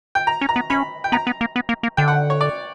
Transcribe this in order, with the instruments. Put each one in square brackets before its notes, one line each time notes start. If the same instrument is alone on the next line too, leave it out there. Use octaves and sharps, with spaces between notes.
[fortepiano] G5
A#5
[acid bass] C#4
[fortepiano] A#5
[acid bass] B3
[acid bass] C#4 [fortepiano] B5
[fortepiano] G5
[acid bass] B3 [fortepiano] A#5
[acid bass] B3
A#3
B3
A#3
A#3
[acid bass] D3 [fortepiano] G5
[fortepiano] F#5
C#5
D5